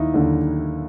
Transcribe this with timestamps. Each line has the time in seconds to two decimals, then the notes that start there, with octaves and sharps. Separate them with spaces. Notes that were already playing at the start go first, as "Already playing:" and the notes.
Already playing: D#2 D#4 E4
0.14 D#2 D3